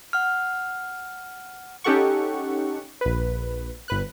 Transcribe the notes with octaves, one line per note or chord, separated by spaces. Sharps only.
F#5 F6
C#4 D#4 G4 A4 F#5 C#6
A#1 B4
G1 B4 F#6